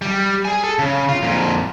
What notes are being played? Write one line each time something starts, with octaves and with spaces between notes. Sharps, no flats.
G3
G#4 G#5
A4
C#3
F4
F2 A#2